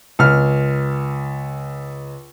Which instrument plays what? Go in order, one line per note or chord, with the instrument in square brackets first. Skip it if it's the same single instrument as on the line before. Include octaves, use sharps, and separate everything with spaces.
[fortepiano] C#2 F6